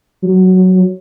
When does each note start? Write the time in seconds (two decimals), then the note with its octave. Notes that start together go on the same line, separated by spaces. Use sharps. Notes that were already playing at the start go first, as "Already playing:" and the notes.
0.23 F#3